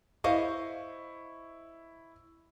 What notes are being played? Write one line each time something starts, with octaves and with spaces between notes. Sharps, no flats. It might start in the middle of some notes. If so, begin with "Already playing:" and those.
E4 C5 D#5 F5 C#6